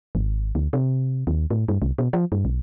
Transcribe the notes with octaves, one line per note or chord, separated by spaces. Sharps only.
G#1
D2
C3
D#2
A2
G2
C2
B2
F3
G2
B1